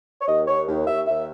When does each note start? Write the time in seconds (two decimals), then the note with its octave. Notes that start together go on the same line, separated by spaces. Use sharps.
0.21 C#5
0.28 D#2 D#5
0.48 D#2 C#5
0.68 D#2
0.87 D#2 E5
1.07 D#2 E5